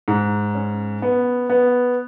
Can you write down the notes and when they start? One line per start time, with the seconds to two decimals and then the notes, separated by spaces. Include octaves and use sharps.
0.08 G#2
0.55 C#4
1.02 B3
1.50 B3